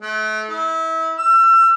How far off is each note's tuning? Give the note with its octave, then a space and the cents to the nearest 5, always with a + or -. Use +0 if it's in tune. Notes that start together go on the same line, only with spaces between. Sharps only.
A3 -35
E4 -30
E6 +35